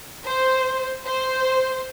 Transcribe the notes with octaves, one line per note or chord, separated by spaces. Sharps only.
C5
C5